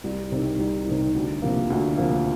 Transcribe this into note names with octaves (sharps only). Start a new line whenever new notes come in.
C2
C3 D#3
C2
C3 D#3
D2
C3 F3 A#3
D2
C3 F3 A#3